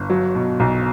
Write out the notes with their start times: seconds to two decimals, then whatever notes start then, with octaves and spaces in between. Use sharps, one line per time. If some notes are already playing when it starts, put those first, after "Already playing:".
Already playing: G1
0.10 F#3
0.35 B2
0.60 B1